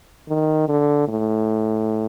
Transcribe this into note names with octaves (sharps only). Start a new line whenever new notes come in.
D#3
D3
A2